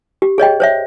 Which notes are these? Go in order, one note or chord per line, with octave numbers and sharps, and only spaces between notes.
G4
G#4 C#5 D#5 G5
C5 C#5 E5